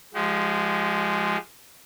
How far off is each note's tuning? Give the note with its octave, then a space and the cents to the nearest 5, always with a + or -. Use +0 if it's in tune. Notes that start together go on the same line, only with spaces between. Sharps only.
F3 -5 G#3 +0 G4 -40